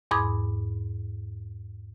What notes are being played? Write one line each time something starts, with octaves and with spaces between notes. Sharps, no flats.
E2 G#2 B5 D6 D#6 G#6